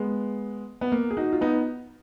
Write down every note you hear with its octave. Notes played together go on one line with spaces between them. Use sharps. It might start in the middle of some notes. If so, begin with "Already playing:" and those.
Already playing: G#3 B3
B3
A#3
G#4
D#4 F#4
F4
B3 D#4